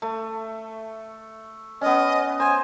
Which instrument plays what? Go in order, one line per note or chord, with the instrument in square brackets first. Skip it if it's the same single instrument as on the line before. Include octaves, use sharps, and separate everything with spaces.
[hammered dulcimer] A3
[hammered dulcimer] B3 C#4 [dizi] D#5
[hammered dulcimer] C5 [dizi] G#5